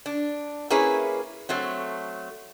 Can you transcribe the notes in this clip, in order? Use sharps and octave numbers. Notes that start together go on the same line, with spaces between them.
D4
A#3 C#4 E4 G#4 B4
F#3 A3 C4